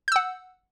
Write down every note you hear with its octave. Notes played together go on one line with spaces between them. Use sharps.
F#5 E6 G6